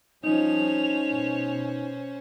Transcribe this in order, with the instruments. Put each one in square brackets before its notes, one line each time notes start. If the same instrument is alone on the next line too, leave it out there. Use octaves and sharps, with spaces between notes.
[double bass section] F3 G3 [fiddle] C#4 C5 [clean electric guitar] D#4 [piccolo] F7
[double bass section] B2